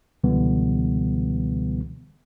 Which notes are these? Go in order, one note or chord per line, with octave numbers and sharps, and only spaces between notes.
C#2 B2 D3 E3 G3 B3